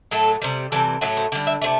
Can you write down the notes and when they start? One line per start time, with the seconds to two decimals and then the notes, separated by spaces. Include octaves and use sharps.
0.11 A2 F#3 A3 A4
0.42 C3 G3
0.72 C3 E3 G3 A4
1.01 A2 F#3 A3 F#4
1.17 C5
1.32 D3 D5
1.35 G3
1.47 E5
1.61 C3 E3 A3 D5